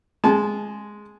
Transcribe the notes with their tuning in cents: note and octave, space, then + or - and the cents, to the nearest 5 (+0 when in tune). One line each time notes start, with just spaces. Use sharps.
G#3 +0 A5 -25